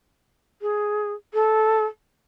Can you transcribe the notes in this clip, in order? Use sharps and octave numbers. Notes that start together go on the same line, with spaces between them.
G#4
A4